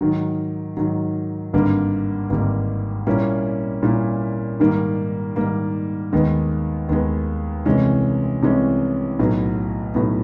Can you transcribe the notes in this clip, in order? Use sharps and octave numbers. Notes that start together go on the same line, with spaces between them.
G#2 D#3 F#3
G#2 D#3 F#3
G#1 G2 D3 G3 A#3
G#1 G2 D3 G3 A#3
A#2 G3 A#3 C#4 E4
A#2 G3 A#3 C#4 E4
G#2 D#3 G3 A#3
G#2 D#3 G3 A#3
D#2 D#3 G#3 B3
D#2 D#3 G#3 B3
C2 C3 E3 G#3 C#4
C2 C3 E3 G#3 C#4
B1 A2 F#3 B3
B1 A2 F#3 B3